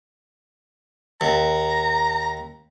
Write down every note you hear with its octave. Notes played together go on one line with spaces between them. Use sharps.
D#2 A#5